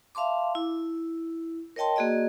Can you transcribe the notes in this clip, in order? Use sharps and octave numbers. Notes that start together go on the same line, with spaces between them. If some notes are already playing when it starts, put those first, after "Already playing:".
E5 F5 A5 C6 D6
E4
A#4 C#5 D#5 G5 A5 C6
A#3 F#4 G#4 D5 D#5